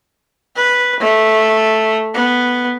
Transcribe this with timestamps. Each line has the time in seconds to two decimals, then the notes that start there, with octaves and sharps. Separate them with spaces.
0.56 B4
1.00 A3
2.14 B3